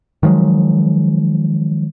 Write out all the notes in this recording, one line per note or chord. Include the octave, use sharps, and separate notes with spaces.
D#3 F3 F#3 G#3